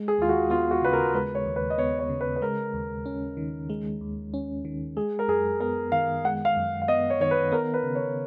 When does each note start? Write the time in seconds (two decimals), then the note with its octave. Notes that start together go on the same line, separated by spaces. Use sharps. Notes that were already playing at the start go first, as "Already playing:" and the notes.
Already playing: G#3
0.08 G#4
0.18 D#2 F4
0.29 F#4
0.50 B3 F4
0.71 F#4
0.82 C#3 B4
0.93 A#4
1.14 G#3 B4
1.35 C#5
1.46 D#2
1.56 B4
1.70 D#5
1.78 B3 C#5
1.99 C#5
2.09 C#3
2.21 B4
2.36 B4
2.42 G#3 A#4
2.74 D#2
3.06 C#4
3.37 D#3
3.70 G#3
4.01 D#2
4.34 C#4
4.65 D#3
4.97 G#3 G#4
5.19 A#4
5.28 F#2 G#4
5.60 B3 A#4
5.92 D#3 F5
6.24 G#3 F#5
6.45 F5
6.56 F#2
6.82 F5
6.88 B3 D#5
7.10 C#5
7.20 D#3 C#5
7.31 B4
7.52 B3 A#4
7.74 B4
7.83 C#3
7.95 C#5